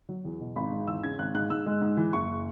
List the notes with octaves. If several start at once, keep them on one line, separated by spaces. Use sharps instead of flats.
F#3
E2
B2
G#1 B5
G#2
E2 E6
C#3 G#6
G#1 F#6
G#2 F#6
G#2 E6
G#3
G#2
E3
F#1 C#6